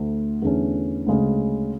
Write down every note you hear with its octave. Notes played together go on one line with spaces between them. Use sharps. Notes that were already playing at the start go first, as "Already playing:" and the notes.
Already playing: D2 D3 A3
E2 D3 A3 C#4
D2 C#3 G#3 C#4